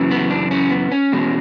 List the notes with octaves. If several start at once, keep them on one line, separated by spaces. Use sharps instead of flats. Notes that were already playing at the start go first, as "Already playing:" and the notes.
Already playing: F#2 C#3 E3
B3
D4
C#4
B3
C#4
E2 B2 G#3